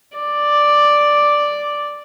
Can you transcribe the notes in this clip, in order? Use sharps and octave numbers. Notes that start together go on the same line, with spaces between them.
D5